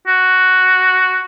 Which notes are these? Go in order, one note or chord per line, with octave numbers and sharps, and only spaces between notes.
F#4